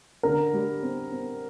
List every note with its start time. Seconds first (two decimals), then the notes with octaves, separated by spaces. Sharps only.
0.23 D3 A#4
0.53 G3
0.83 C4
1.12 C4